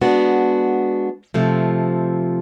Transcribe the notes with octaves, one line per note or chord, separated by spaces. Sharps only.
G#3 B3 D4 F#4
C3 F3 A3